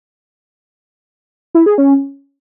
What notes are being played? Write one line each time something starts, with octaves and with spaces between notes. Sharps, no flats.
E4
G#4
C#4